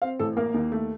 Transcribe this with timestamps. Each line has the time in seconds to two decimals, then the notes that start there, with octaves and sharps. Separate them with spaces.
0.02 C4 F5
0.19 A1 A4
0.37 A#3 A#4
0.54 D#2
0.72 A3